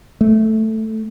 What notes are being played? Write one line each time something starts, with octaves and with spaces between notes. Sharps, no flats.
A3